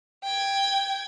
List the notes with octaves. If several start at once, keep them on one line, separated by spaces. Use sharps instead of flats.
G5 G#6